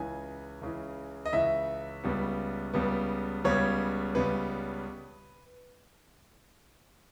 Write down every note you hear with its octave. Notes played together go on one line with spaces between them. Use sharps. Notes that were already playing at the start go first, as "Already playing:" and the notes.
Already playing: C#2 C#3 E3 G#5
C#2 C#3 E3
D#5
C#2 C#3 E3 E5
C#2 C#3 G3 B3
C#2 C#3 G3 B3
C#2 C#3 G3 B3 C#5
C#2 C#3 G3 B3 B4